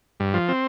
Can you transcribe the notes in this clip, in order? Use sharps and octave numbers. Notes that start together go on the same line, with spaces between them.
G2
F3
C4